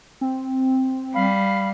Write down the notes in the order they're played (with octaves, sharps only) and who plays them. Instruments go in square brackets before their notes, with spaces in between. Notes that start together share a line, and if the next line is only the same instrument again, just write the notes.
[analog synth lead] C4
[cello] G3 [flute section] F5 B5